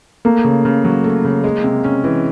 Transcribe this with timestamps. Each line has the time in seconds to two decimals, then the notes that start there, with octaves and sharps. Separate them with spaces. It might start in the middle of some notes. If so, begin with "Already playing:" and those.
0.25 A3 A#3
0.44 C#3
0.65 C#3
0.84 F#3
1.04 A3
1.25 C#3
1.44 G#3
1.64 C3
1.84 C#4
2.04 E3